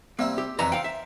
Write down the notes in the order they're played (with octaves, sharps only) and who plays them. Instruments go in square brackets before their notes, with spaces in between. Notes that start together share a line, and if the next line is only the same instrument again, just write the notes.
[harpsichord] C3 G3 E4 [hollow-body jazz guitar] A#3
[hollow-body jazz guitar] G4
[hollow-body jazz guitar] F2 E5 A#5 [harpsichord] E3 D4 G#5
[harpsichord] C5 [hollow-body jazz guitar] F5 G5
[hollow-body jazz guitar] E5